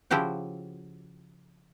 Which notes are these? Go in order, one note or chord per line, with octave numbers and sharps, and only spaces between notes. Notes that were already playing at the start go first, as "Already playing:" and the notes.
C#3 F3 E4 F#4 G4 G5